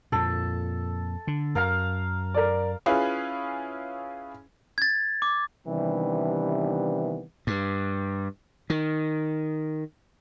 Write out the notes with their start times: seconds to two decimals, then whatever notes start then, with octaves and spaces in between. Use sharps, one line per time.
0.12 F2 A#2 A4
1.27 D3
1.55 F#2 A#4 F5 A#5
2.34 A#4 D5
2.86 C#4 E4 F4 G#4 B4
4.78 G#6 A6
5.22 D6
5.67 C3 D#3 E3 G3 B3 D4
7.47 G2
8.70 D#3